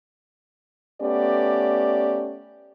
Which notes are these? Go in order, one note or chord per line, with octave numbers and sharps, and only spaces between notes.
A3 B3 C#4 G4 D5